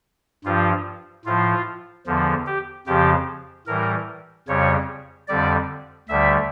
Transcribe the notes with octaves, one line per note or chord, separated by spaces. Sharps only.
G2 F3 F4
A2 F3 F4
E2 D3 F3
G4
F2 C#3 F3 G4
A2 E3 G3 A#4
F2 C#3 G3 C#5
F2 D3 G3 D5
D2 D3 G3 E5